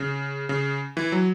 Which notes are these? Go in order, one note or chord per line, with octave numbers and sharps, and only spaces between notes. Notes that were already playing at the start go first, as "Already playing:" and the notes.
Already playing: C#3
C#3
E3
F#3